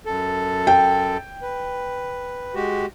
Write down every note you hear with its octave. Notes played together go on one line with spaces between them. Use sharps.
F#2 A4
G5
B4
G#3 F#4 G4